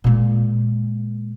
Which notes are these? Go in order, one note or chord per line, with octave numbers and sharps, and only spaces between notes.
A#2 G#3